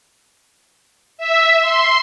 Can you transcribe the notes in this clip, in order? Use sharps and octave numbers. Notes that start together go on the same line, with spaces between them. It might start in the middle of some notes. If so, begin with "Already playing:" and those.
E5
C6